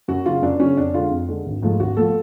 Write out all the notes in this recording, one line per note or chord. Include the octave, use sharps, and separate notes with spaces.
F#2 F#4
C#3 F#3 F4
F#2 D4
C#3 F#3 C#4
F2 D4
D3 G#3 F4
F2
D3 G#3
G#1
G#2 F3 A3
G#1 F#4
F3 A3 A4